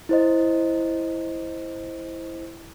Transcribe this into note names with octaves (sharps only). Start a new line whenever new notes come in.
E4 C5 D#5